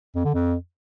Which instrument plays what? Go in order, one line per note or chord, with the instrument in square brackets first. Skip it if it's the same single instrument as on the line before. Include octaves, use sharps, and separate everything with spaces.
[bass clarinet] F2
D3
F2